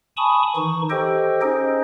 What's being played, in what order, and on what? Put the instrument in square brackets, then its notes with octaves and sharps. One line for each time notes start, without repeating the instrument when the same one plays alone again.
[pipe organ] G#5 A5 B5 C#6 D#6
D#3 E3 D#4 C#6
G4 A4 C5 D#5 G5
C#4 D#4 G#4 C5 D#5